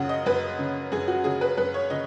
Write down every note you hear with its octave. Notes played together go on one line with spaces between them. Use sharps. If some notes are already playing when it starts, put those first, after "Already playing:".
Already playing: F#2 C#3 F#5
D#5
F#2 B4
C#3
F#2 G#4
F#4
C#3 G#4
B4
F#2 B4
C#5
C#3 D#5